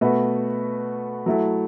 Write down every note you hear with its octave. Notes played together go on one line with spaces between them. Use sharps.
B2 A3 F#4 B4
F#3 A3 E4 A4